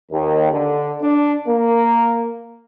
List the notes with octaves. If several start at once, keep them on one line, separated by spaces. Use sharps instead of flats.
D#2
D3
D4
A#3